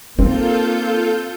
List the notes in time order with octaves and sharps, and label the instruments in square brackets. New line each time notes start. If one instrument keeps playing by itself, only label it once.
[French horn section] A#3 [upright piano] C4 [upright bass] D#4 [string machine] F4 A4 G6